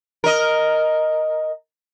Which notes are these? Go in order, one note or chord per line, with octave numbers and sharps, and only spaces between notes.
A#4 D#5